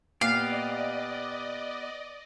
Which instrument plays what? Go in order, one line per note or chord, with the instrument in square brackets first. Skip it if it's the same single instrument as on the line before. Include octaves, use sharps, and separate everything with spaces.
[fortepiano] A#2 [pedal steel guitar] B3 G4 [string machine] D5 D#5 [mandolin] F5